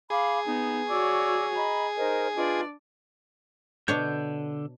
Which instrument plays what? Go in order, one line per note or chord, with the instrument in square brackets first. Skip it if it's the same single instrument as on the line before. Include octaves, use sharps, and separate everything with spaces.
[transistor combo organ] G#4 [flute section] F5 B5 D6
[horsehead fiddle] B3 [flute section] D#4
[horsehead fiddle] F#4 C#5 [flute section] D5 D6 E6
[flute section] D#5 A#5 B5
[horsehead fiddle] D#4 [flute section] A#4 C5 D#5
[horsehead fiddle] D4 D5 [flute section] F4 B4 D#5
[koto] B2 D4 C#5 [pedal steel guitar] D3 G6